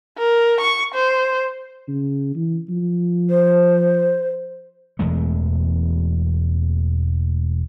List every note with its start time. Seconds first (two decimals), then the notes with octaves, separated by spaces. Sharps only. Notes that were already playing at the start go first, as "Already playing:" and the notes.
0.18 A#4
0.61 C#6
0.95 C5
1.88 C#3
2.36 E3
2.69 F3
3.30 C5
4.99 E1 E2 G#3 A3